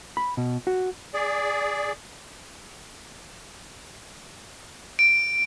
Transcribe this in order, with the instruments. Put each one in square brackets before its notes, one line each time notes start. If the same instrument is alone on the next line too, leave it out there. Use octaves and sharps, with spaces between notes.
[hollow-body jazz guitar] B5
B2
F#4
[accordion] G#4 D5
[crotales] D7